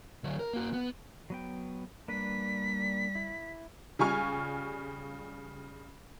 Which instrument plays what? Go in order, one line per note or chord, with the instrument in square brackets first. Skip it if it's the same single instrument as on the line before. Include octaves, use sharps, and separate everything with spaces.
[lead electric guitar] D3 F#3
A#4
A#3 F#4
B3
[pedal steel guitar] F#3 B3 G5
[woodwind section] G3 [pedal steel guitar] A#3 D4 B4 [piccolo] B6
[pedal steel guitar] E4
[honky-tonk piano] C#3 G3 F4 G#5 C#6 F6